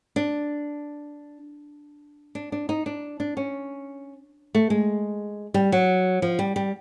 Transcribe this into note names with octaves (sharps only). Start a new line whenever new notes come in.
D4
D4
D4
D#4
D4
D4
C#4
A3
G#3
G3
F#3
F3
G3
G3